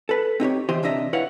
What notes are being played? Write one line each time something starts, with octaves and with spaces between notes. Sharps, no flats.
A4 B4
C4 D#4 G4 C#5
E3 G4 C5 D#5 C6
C3 D4 D#5 E5 A#5
E4 B4 C#5 F5 F#5